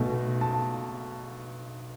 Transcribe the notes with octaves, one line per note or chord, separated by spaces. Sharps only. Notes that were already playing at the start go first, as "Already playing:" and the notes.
Already playing: B1 B2 A3
A5